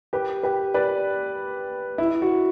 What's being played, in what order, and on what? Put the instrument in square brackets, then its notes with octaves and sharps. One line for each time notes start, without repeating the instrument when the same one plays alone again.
[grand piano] G4 B4
G4 B4
B4 D5
E4
F#4